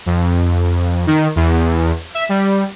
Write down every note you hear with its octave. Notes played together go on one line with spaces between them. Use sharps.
F2
D#3
E2
E5
G3